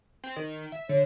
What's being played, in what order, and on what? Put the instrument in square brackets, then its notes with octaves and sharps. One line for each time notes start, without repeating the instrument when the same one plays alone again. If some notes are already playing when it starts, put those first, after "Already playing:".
[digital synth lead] C4
D#3
E5
[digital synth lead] D3 [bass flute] C#5